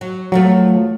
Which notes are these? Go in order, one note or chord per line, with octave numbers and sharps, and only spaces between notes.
F#3
E2 F3 F#3 A3